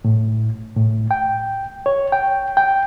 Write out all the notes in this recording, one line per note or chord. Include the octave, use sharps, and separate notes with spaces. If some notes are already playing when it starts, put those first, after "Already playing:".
A2
A2
G5
C#5
G5
G5